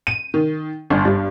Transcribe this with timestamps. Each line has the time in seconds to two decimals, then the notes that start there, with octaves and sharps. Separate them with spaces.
0.07 D#7
0.34 D#3
0.90 G1
1.05 G2